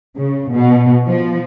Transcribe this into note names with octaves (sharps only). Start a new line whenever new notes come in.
C#3
B2
F3